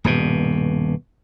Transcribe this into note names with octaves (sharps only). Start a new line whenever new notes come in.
D#1 G2 B2